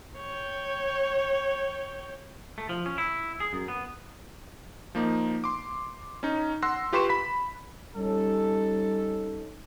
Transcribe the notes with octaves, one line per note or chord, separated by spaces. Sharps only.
C#5 G5
A3
F3
C#4
E4
G#4
F#2
B3
F3 A#3 D#4
C6 D6
C#4 D#4
F#5 C6 E6 F#6 A#6
F4 G4 B4 C6 C#6 E7
B5 B6
G3 C#4 D#4 A4